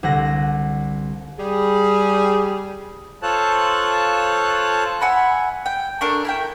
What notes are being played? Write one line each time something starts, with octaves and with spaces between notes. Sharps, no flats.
C2 D3 F#5 A#6
G3 G#4
F4 A4 C5 C#5 A5 F#6
E5 F#5 G#5 B5
G5
A3 D4 A#4
E4 A#4 G5